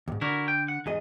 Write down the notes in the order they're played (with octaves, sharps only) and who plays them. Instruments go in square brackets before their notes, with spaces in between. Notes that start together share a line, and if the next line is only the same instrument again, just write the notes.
[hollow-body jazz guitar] D#2 G#2
[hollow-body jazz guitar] D3 [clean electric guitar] E4 F#4 A#4
[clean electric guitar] G5
F#5
[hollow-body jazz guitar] E2 G#4 D#5 [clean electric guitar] G#2